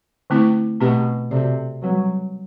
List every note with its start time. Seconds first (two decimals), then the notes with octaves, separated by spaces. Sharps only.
0.30 D3 A3 C4 E4
0.80 B2 A3 C4 G4 B4
1.31 C3 C4 F#4 A4 D5
1.82 F#3 G3 C4 F#4 B4